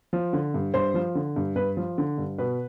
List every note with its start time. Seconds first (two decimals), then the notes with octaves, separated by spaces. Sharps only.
0.13 F3
0.33 D3
0.54 G2
0.74 G2 C5
0.94 F3
1.15 D3
1.36 G2
1.56 G2 B4
1.77 F3
1.98 D3
2.18 G2
2.38 B2 B4